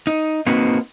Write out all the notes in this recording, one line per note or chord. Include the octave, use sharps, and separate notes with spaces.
D#4
A#3 C4 D#4 F#4 B4